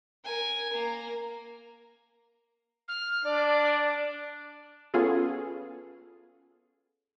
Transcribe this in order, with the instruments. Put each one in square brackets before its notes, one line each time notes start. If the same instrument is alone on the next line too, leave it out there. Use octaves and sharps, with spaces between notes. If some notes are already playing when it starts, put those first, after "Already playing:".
[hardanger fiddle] A#4 G#5
A#3 A#5
[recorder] F6
[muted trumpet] D4 [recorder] D5
[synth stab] B3 C#4 F4 G#4 A4